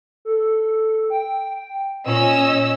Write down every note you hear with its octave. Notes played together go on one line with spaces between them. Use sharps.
A4
G5
A#2 C#4 D#5 E6